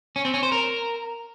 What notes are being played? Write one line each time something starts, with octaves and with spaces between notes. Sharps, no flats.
C#4
C4
C#4
C5
A#4